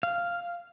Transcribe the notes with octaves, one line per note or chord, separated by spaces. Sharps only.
F5